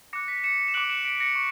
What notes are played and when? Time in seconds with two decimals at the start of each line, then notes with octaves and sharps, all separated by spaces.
0.13 D6 F#6 A#6 C#7
0.28 B6
0.44 C#7 E7
0.68 E7
0.74 D6 F#6 D7 F#7
0.90 C#7 E7
1.05 B6 D7
1.20 A#6 C#7
1.35 C#6